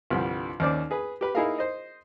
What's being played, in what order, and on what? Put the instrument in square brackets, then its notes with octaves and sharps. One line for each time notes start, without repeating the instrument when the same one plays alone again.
[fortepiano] C2 G2 D3 F3 G3
D#2 C#4 C5 D5 D6
G#4 B4
G4 B4
D#4 E4 G#4 A#4 F5
C5 D#5